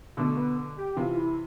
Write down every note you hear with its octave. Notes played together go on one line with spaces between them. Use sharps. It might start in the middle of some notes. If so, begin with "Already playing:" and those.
B2 D3 A3
B3
G4
C3 E3 F4
E4